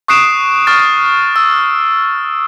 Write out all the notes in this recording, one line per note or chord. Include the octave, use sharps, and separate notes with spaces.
C#6 D#6 F#6 C7 D7 E7
C#6 F6 A6
E6